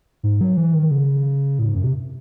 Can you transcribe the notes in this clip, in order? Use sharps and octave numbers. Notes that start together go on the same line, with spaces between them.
G#2
F#3
E3
D#3
C#3
A2
G#2
F#2
C3